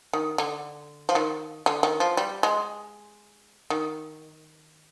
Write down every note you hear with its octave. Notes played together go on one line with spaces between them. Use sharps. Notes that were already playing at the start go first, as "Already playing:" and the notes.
D#3
D3
F3
D#3
D3
D#3
F3
G3
G#3
D#3